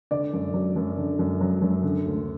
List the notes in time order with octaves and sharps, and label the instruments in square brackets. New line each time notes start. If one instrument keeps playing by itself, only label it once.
[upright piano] D3 D5
F#2
F#3
F#2
D3
F#2
F#3
F#2
D3
D2